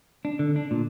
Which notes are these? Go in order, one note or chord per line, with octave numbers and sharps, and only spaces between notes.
D4
D3
D4
A#2